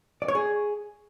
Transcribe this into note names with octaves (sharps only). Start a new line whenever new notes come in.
D5
C#5
G#4